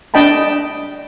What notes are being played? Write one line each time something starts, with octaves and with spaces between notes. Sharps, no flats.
D4 D#5 G5 A5 B5